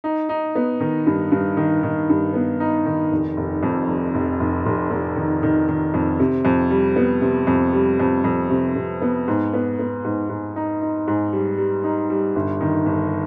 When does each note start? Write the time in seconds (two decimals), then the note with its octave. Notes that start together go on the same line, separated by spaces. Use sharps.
0.04 D#4
0.29 D#4
0.55 B3
0.80 D#3
1.07 G2
1.32 G2
1.57 D#3
1.83 D#3
2.09 G2
2.34 B3
2.60 D#4
2.86 D#3
3.12 F1
3.37 F1
3.63 F2
3.88 F1
4.15 F1
4.40 F1
4.66 F1
4.90 F1
5.16 D#3
5.43 D#3
5.69 D#3
5.94 F2
6.20 C3
6.45 F2
6.70 G3
6.96 B3
7.22 C3
7.47 F2
7.73 G3
8.00 F2
8.24 F2
8.50 C3
8.76 C3
9.02 B3
9.28 G#2
9.53 B3
9.79 B3
10.04 G#2
10.29 G#2
10.56 D#4
10.81 D#4
11.07 G#2
11.33 G3
11.58 G3
11.84 D#4
12.10 G3
12.36 G1
12.61 D#3
12.86 G1